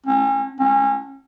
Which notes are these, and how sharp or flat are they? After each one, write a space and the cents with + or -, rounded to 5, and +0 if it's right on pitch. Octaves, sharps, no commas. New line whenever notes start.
C#4 -35
C#4 -30